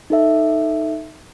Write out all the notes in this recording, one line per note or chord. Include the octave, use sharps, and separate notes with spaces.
D#4 A4 E5